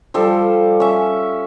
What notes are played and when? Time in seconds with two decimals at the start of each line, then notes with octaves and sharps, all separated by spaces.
0.14 F3 G3 A4
0.80 C#4 E5